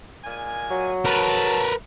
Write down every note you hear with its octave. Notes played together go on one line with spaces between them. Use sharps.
A#2 G#3 G#5
F#3
A#4 B4 A5